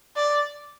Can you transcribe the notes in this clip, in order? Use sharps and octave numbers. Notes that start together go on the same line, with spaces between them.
D5